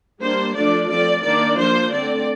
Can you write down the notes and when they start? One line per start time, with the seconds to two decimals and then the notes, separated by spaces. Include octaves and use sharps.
0.21 G3 A#3 D4 C5
0.54 F3 A3 D4 D5
0.89 F3 A3 C4 D5
1.23 D#3 A#3 D4 D5
1.57 F3 A#3 D4 C5
1.91 D3 A3 C4 D5